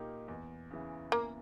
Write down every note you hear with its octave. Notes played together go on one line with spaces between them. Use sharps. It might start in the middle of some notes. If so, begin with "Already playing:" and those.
Already playing: A#2 A#3 D#4 G4
E2
C#3 E3
E2 A#3